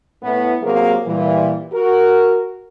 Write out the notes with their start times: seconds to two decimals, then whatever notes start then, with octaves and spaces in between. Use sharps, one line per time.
0.22 A2 B3
0.62 C3 F#3 A#3 G#4 A#4 C5
1.05 A#2 E3 G3
1.73 F#4 A#4